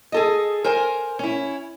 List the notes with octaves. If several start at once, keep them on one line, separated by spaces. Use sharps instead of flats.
G#4 A4 D#5
A#4 C5 G#5
C#4 E4